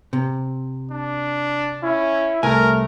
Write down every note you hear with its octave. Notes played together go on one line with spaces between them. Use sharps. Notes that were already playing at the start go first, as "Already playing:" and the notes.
C3
D4
C#4 E4
C2 A3 A#4 G#5